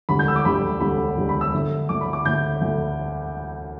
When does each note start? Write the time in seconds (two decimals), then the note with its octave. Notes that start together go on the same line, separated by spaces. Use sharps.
0.09 E1 D2 D3 G3 B5
0.19 G6
0.28 E6
0.36 D6
0.45 E1 D2 D3 G3 B5
0.80 E1 D2 D3 G3 B5
1.17 E1 D2 D3 G3
1.29 B5
1.41 E6
1.53 D2 D3 A3
1.89 D2 D3 A3 D6
2.01 B5
2.13 D6
2.25 D2 D3 A3 G6
2.61 D2 D3 A3